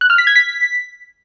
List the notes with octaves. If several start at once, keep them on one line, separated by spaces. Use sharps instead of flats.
F#6
F6
B6
G#6
B6